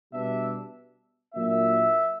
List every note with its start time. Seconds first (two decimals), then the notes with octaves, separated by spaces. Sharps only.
0.11 B2 G3 B3 D4 E5
1.34 A#2 F#3 A#3 D4 E5